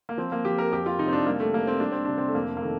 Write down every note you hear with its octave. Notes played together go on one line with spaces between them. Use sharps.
A#3
F3 C4
A#3
F3 G4
A#4
F2 G4
F4
C3 D#4
C4
D4
G3 A#3
A3
G3 A#3
C4
G3 D4
C4
C3 D4
C4
A3
F2 A#3
A#3
D#3 A3